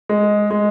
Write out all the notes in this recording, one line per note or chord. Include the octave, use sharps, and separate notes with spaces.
G#3
G#3